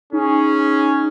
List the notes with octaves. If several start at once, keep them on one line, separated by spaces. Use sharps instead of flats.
C#4 D#4 G#4